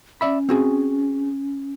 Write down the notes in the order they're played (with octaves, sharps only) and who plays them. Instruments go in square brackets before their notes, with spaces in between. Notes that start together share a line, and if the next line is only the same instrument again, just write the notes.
[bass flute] C#4 [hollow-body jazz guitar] D5 E5 B5
[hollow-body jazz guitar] C4 F#4 G#4